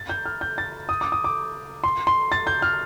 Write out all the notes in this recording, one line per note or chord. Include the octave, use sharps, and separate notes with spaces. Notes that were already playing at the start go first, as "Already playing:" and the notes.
Already playing: A6
G6
F6
G6
A6
D#6
D6
D#6
D6
C6
C6
A6
G6
F6